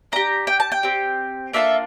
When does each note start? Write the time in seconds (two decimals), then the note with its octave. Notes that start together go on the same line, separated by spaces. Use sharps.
0.12 D4 G4 A#5
0.47 G5
0.60 A5
0.72 G5
0.83 C4 G4
1.53 A#3 D4 F4 A4 E5